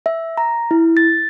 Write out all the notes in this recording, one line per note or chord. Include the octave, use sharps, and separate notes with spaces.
E5
A#5
E4
A6